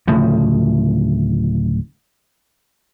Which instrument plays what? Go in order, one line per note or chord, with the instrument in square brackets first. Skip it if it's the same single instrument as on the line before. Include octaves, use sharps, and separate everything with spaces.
[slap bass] D1 A2 C#3 F3